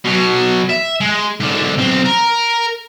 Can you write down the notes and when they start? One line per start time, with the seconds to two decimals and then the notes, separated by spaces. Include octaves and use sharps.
0.05 B2 F#3
0.69 E5
1.01 G#3
1.41 G#2 D3
1.78 B1 C4
2.05 A#4